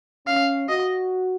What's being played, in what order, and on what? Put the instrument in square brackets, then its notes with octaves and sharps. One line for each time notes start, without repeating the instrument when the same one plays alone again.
[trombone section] C#4 [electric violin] F5
[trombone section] F#4 [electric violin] D#5